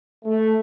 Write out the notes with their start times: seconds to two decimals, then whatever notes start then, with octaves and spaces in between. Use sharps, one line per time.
0.25 A3